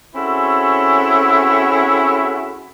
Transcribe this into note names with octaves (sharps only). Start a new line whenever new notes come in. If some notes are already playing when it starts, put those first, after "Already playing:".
C4 C#4 E4 F#4 G#4 A4